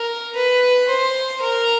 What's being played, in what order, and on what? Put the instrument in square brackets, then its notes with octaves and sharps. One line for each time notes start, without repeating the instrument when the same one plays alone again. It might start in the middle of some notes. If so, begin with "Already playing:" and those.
Already playing: [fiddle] A#4
B4
C5
A#4